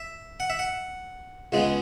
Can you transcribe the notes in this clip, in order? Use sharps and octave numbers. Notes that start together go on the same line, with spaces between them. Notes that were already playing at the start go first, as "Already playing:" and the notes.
Already playing: E5
F#5
E5
F#5
C#2 C#3 G#3 B3